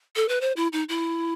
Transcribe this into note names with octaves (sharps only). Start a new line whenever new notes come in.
A4
B4
C5
E4
D#4
E4